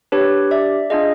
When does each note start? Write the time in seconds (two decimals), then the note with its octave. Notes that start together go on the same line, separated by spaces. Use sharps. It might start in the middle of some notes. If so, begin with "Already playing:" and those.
0.12 D4 G4 B4 C#5
0.51 D5 E5
0.90 D4 F4 G#4 D#5 F5